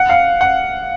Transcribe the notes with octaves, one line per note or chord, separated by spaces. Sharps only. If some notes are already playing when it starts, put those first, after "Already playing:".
Already playing: F#5
F5
F#5